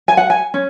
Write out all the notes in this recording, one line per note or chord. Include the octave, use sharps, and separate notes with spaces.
G#5
F#5
G#5
C#4